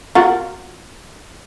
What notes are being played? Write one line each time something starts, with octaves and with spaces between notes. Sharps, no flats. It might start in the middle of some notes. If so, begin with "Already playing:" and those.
F4 F#4 A#4